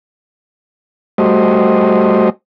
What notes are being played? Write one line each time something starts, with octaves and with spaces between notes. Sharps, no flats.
G3 A3 F#4 C5 D#5